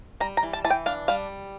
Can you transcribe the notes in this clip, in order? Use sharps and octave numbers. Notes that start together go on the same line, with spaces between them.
G3 A#5
A#5
E3
A5
E3 A5
G5
D4 F5
G3 F5